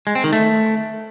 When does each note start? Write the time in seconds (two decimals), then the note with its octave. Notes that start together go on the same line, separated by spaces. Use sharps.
0.07 G#3
0.15 C4
0.24 D#3
0.33 A3